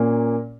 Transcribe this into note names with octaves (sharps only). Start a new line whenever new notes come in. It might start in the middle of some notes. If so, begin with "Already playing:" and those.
Already playing: A#2 A#3 C#4